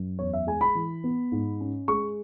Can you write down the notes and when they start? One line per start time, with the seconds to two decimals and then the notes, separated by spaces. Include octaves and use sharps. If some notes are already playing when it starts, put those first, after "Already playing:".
Already playing: F#2
0.19 E2 C#5
0.33 E5
0.47 G#3 G#5
0.61 B5
0.75 E3
1.04 B3
1.32 G#2
1.60 C#4
1.88 G#3 C#6